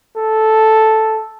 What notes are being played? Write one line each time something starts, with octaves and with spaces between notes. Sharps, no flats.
A4